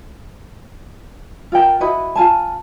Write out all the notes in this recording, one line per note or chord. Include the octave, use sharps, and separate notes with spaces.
F4 A#4 G5 A5
E4 F#4 B4 D#5
F4 G#5 A5